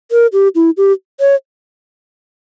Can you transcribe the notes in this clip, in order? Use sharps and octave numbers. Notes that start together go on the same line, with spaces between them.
A#4
G4
E4
G4
C#5